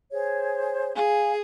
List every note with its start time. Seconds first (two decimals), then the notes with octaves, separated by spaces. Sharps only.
0.12 G#4 C5 C#5
0.95 G#4 F5 G#5